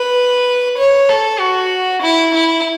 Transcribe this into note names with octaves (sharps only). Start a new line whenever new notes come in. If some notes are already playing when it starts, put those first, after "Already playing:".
Already playing: B4
C#5
A4
F#4
E4
E4